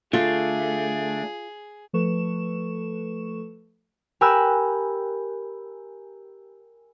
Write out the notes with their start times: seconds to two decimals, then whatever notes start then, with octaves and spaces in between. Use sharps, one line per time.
0.13 D3 A3 F4 G#4
1.93 F3 A3 A4 B4 C#6 E7
4.21 G4 A#4 G#5 B5 E6 F#6